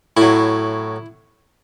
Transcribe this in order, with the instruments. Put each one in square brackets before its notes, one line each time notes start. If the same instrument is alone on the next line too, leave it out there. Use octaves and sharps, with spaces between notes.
[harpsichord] A2 F#3 E4